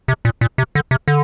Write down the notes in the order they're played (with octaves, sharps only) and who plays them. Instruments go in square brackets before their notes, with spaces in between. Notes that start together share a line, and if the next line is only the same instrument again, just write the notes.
[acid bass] C3
A#2
A#2
C3
D3
C3
D3